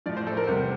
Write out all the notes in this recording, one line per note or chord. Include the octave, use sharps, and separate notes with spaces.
A2 F3 D5
C5
A4
A#4
E2 C3 G3 C5